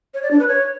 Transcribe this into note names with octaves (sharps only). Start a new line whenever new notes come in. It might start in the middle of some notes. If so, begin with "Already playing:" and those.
C#5
D5
D4
B4
C#5